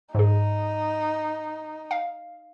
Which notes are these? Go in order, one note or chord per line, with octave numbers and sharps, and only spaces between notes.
G#2 D#4 G#4
F5